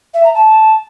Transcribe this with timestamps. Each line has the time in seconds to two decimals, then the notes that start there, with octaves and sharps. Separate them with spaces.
0.13 E5
0.23 A#5
0.34 A5